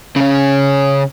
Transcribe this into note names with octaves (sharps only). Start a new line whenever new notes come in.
C#3 C#4